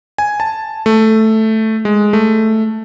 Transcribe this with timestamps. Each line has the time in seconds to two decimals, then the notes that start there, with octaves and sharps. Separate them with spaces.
0.18 G#5
0.40 A5
0.86 A3
1.85 G#3
2.13 A3